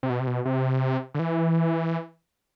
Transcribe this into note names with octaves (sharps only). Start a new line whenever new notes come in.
C3
B2
C3
B2
C3
D3
E3